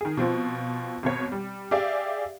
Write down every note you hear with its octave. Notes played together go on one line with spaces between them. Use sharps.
D#3 G#4
B2 F3 C4 F4
G#1 B2 C#5
G3
G4 G#4 D5 E5 F5